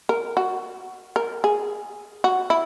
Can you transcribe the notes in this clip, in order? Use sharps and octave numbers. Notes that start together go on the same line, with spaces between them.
A#4
F#4
A#4
G#4
F#4
E4